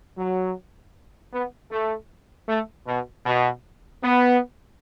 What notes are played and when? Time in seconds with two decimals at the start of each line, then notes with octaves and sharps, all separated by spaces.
0.17 F#3
1.32 B3
1.70 A3
2.47 A3
2.86 B2
3.25 B2
4.02 B3